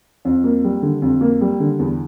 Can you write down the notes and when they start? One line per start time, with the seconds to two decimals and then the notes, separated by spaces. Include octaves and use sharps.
0.25 F2
0.44 A#3
0.64 G3
0.82 D3
1.02 F2
1.21 A#3
1.41 G3
1.60 D3
1.79 E2